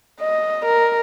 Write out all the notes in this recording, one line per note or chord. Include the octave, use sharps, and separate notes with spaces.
D#5
A#4